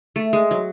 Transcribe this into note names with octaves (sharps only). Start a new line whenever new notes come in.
A3
G#3
F#3